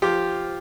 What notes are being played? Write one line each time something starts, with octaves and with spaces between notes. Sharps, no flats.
F3 F4 G4